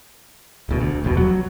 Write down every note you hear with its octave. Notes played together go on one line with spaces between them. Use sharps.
D1 D2 B2
D2
E1 C2 F2 B2
F#3